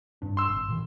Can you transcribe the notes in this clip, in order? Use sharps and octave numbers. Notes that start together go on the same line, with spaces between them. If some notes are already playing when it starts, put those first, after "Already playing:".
G2 D4
C6 E6
G#1
A#2 D#3 E3